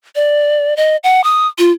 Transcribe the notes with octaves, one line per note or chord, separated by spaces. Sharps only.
D5
D#5
F#5
D#6
F4